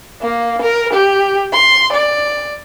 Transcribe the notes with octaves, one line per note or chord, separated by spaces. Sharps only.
A#3
A#4
G4
C6
D5